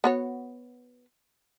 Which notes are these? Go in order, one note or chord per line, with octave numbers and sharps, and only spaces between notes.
B3 F#4 C#5